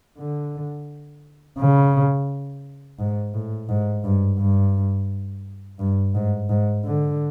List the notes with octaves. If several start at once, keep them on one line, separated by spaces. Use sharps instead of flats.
D3
C#3
G#2
A2
G#2
G2
G2
G2
G#2
G#2
D3